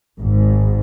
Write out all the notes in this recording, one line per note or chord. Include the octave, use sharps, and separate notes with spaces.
G#1 G#2